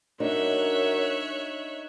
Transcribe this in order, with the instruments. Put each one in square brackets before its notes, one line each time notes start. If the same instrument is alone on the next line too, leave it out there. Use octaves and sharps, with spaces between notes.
[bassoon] F#2 [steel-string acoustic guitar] D4 D#4 [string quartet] C#5 E5 F#6